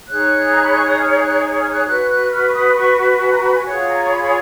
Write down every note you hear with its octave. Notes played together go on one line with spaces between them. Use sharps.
D#4 G#4 C#5 F#6
A#5
B5
C#6
D#6
F6
F#6
F6
F#6
F#4 B4 F#6
F#6
F6
C#6
D#6
B5
C#6
F#5
G#5
A#5
B5
G#5
F4 G#4 C#5 F#5
A#5
C#6
B5
B5